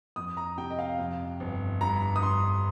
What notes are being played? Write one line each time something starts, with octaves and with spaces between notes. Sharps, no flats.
F2 D#6
A#5
C3 G5
D#5
F5
F2
G1
G2 A#5
D#6
G2 C6